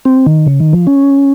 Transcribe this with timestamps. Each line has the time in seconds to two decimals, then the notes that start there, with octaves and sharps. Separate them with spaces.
0.05 C4
0.26 D#3
0.46 C#3
0.60 D#3
0.73 F3
0.87 C#4